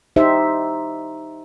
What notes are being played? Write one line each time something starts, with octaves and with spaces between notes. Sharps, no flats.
D#4 G4 C5 E5